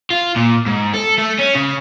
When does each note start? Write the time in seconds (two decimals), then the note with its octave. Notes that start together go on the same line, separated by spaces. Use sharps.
0.11 F4
0.36 A#2
0.66 G#2
0.94 A4
1.18 A3
1.39 C#4
1.55 C#3